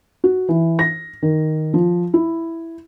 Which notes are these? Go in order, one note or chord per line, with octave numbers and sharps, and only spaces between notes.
F#4
E3
A#6
D#3
F3
E4